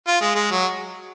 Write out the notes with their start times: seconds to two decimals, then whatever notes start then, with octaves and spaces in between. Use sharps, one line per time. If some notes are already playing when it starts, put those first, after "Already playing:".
0.07 F4
0.21 G#3
0.35 G#3
0.51 F#3